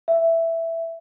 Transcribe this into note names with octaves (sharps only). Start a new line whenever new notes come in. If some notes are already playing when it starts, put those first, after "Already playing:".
E5